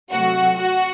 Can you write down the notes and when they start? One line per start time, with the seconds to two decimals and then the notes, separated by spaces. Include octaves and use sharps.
0.11 C3 F#3 A3 F#4 F#5
0.59 F#4 F#5